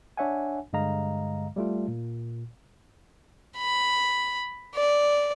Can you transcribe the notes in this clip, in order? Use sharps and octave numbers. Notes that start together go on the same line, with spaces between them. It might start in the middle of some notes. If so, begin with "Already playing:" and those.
D4 C#5 E5 F#5 G#5
G2 D3 G#3 D#5 F5 A#5
G3 A3 F4
A#2
B5
D5